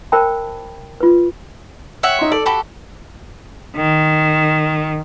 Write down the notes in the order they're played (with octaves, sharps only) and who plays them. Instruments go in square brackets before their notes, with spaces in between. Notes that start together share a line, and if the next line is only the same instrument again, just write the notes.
[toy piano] A#4 C5 E5 G5 A5 B5
F4 B4
[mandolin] C#5 E5 F#5 [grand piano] G5
[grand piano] D#4 C6
[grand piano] A4 [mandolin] D5
[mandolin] F#4 G4 A4 [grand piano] B5
[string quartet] D#3